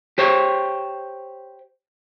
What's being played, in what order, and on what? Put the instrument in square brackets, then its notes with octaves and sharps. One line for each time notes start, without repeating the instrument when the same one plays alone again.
[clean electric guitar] G4 C5 C#5